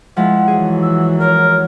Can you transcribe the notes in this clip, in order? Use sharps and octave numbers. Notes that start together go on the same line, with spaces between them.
F3 G#3 E4 F#5
E3 F#3 G#4
E6
A#4 C#5